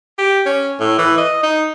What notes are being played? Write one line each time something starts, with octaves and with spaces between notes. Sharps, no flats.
G4
C#4
A2
E3
D#5
D#4